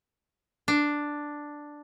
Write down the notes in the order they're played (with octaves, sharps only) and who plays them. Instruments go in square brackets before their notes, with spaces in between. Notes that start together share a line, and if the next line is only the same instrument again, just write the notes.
[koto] D4